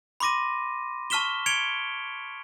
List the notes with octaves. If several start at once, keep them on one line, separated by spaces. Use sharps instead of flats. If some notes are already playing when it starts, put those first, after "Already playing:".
B5 C6 D6 A#6 D#7
A5 C#6 F6 B6 E7 G7
G#6 C#7 D7 F7 G7